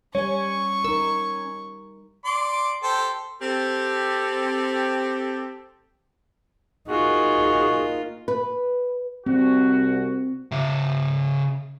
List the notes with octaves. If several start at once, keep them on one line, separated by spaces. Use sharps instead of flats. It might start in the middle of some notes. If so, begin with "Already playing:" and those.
G3 C#4 C#5 G#5 C#6
D#4 A#4 E6
D5 C6 D6
G4 A4 C5
C4 G4 A4
A#3 D#4 F4 F#4 G#4
B4
C2 C4 F#4
C#3 E5